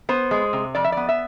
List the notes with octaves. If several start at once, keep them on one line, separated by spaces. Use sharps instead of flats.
B3 C5
G#3
C3
F2 D5
E5
B3 D5
E5